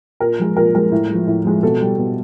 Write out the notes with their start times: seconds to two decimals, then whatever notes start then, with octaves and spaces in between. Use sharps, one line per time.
0.20 A#2 A#4
0.39 F3 G#3
0.56 A#2 A#4
0.74 F3 G#3 A#4
0.92 A2
1.09 G#3
1.14 F3
1.27 A2
1.45 F3 G#3
1.63 B2 A4
1.81 G3
1.98 B2